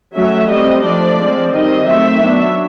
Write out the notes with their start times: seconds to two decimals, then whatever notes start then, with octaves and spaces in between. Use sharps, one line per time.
0.14 F#3 A3 C#4 E5
0.48 G3 D#5
0.54 C4
0.83 F3 A3 D4 D5
1.17 F3 G#3 C4
1.52 D#3 G3 C4 D#5
1.86 D#3 F#3 A3 C4 E5
2.20 F#3 B3 D4